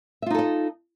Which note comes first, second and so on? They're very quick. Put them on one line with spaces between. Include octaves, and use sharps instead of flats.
E5 F4 D#4 A4 D#5